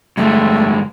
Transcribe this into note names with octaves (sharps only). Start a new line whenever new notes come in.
G2 D3 G#3 A3